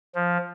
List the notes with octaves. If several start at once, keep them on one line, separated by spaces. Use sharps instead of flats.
F3